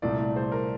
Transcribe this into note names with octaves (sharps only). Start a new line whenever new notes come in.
C2 A#2 A3 D5
C5
A#4